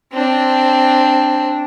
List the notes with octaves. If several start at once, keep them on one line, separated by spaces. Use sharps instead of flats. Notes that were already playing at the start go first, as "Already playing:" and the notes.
C4 D4